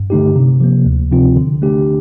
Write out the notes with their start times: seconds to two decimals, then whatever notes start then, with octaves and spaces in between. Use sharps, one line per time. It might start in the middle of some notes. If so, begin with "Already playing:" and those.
Already playing: G2
0.10 D3 A3 D#4 G4
0.36 C3
0.61 F3 A#3
0.86 D2
1.11 C3 F3 C4 F4
1.36 D3
1.62 A3 D4 G4